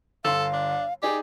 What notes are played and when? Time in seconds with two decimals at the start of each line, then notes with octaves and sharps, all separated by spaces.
0.25 G1 A4 F5 C6
0.53 D4
1.03 D#4 G4 G#4 D5 G#5